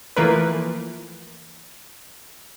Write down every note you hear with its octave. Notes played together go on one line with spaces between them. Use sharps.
E3 F3 A3 A#3 A#4 B4